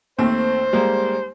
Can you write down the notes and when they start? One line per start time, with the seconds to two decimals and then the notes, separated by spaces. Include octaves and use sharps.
0.19 D#2 A3 C4 C5
0.73 G3 G#3 A#3